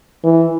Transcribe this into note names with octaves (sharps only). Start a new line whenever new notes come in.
E3